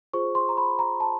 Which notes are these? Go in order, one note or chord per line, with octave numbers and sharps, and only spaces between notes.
F4 G#4 C5 C#6
C6
A#5
B5
A#5
A5